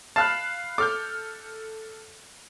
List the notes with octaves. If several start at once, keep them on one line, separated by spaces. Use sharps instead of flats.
F5 A5 B5 F6 F#6
A4 D6 F6 G6